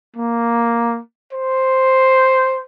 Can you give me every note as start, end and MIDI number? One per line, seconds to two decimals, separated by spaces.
0.16 1.00 58
1.33 2.63 72